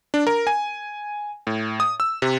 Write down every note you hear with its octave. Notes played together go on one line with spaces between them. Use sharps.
D4
A#4
G#5
A2
D#6
E6
C3